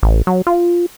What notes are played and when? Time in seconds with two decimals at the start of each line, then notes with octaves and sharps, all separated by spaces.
0.03 A1
0.27 F#3
0.47 F4